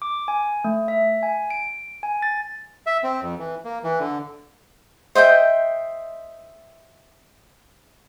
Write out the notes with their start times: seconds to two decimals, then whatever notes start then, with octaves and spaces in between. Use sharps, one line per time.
0.02 D6
0.28 G#5
0.65 A3
0.88 E5
1.23 G#5
1.50 D7
2.03 G#5
2.22 A6
2.86 E5
3.03 C4
3.22 F2
3.39 E3
3.64 A#3
3.83 E3
3.99 D3
5.15 C5 D#5 E5 G5